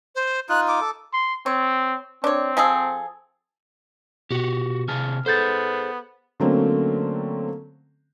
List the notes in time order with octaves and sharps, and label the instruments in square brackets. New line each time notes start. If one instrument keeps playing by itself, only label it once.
[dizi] C5
[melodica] D#4 F4 [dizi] F#6
[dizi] D6
[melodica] A4
[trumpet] C6
[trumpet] C4 [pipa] C#5
[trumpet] C4 [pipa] D4 C#5
[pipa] F3 G#4 A4
[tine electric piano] B2 [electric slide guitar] F#4 G4
[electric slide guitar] C3 G#4 A5 [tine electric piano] F6
[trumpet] B3 [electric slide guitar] G#4 C5 [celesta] A4 G6 A6
[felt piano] D3 F#3 A3 A#3 C4 C#4